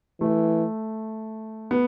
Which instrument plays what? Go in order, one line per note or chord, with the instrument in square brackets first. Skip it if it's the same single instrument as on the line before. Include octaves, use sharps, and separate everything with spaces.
[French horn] E3 [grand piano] A3
[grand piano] B3